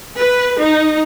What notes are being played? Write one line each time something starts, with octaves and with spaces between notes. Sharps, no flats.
B4
D#4